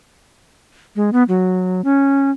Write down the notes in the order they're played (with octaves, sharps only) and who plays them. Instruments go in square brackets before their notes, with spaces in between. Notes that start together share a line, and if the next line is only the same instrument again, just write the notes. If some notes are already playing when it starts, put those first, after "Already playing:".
[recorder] G#3
B3
F#3
C#4